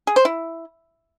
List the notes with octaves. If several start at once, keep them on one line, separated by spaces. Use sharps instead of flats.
G#4
C5
E4